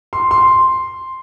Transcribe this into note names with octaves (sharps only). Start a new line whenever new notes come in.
C6
C6